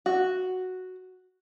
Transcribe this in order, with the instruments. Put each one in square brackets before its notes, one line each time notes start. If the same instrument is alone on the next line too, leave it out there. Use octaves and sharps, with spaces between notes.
[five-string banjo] F#4